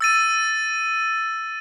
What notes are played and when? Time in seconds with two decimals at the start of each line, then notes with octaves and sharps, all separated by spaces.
0.01 E6 A6 D#7